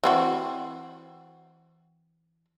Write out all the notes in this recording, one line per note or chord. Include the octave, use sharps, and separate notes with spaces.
E3 C4 F#4